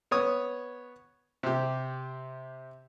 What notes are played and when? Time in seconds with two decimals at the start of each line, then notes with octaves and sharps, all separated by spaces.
0.11 B3 C#5 D#6
1.43 C3 G4